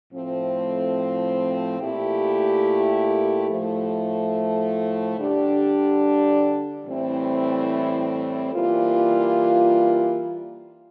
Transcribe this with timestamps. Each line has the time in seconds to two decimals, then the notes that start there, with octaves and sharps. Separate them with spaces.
0.11 A2 F3 A3 C4
1.79 A#2 A3 E4 G4
3.48 A2 F3 A3
5.17 D3 G3 D4 G4
6.85 A2 E3 G3 C4 E4
8.53 E3 G3 A#3 F4